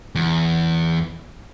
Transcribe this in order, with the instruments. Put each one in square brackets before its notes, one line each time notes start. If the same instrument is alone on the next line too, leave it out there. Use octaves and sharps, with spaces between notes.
[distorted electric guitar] E2